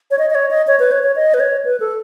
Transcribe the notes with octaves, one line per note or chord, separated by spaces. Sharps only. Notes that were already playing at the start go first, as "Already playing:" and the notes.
C#5
D#5
D#5
C#5
D#5
C#5
B4
C#5
C#5
D#5
B4
C#5
B4
A4